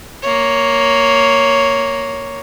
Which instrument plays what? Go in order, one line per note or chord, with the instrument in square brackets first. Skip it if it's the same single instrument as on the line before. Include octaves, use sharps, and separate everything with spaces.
[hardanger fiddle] A#3 C#5